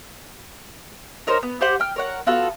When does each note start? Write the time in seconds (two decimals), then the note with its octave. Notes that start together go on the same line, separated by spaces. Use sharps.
1.27 D#4 A#4 C5 C#5
1.43 B3
1.61 G4 C5 F#5
1.80 G5 F6
1.96 A#4 C#5 F#5
2.26 B3 F4 F#4 A4